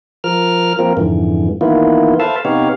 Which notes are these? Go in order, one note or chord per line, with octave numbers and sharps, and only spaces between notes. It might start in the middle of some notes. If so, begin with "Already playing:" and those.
F3 A#4 F6
F3 A#3 C4 A#4
F2 G#2 D3 E3
D#3 E3 A#3 B3 E4 F4
A4 B4 C5 E5 F5 A5
C3 B3 D#4 G4 C#5 F5